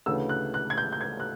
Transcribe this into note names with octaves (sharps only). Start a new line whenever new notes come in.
D2 C#3 E3 E6
F#6
F#6
G#6
G6
G6
G#6
F#6